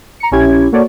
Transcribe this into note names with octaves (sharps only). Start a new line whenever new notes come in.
A#5 C#7
A#1 C#4 E4 G4 G#6
A#3 F#4 A4 C#5 D5